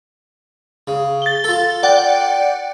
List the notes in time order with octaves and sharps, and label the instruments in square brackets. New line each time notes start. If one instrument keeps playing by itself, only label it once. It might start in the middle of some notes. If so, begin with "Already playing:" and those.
[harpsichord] C#3
[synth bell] A6 G7
[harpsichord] F4 A4
[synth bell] D5 F#5 G5